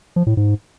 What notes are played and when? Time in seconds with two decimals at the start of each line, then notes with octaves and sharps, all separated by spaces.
0.16 F3
0.27 A2
0.37 G#2